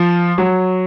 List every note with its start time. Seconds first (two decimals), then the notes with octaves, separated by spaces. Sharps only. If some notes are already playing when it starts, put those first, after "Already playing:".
Already playing: F3
0.38 F#3